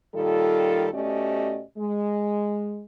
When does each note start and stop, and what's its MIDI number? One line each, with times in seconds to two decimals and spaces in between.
0.15 0.89 46
0.15 0.89 51
0.15 0.89 55
0.15 0.89 65
0.15 0.89 69
0.94 1.62 47
0.94 1.62 57
0.94 1.62 61
0.94 1.62 67
0.94 1.62 74
0.94 1.62 75
1.78 2.85 56